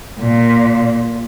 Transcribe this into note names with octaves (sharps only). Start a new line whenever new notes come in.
A#2